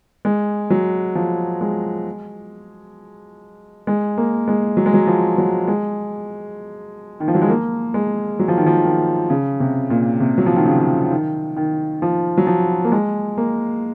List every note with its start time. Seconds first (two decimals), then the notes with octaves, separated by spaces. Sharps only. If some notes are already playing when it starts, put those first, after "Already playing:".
0.25 G#3
0.70 F#3
1.15 F3
1.61 G#3
3.87 G#3
4.17 A#3
4.48 G#3
4.77 F#3
4.86 G#3
4.94 F#3
5.07 F3
5.38 F#3
5.68 G#3
7.20 D#3
7.28 F3
7.35 F#3
7.42 G#3
7.49 A#3
7.94 G#3
8.39 F#3
8.48 F3
8.57 D#3
8.66 F3
8.85 D#3
9.30 C#3
9.60 C3
9.90 A#2
10.20 C3
10.38 F#3
10.46 F3
10.56 D#3
10.65 C#3
11.11 D#3
11.57 D#3
12.02 F3
12.38 F#3
12.47 F3
12.84 A#3
12.92 G#3
13.37 A#3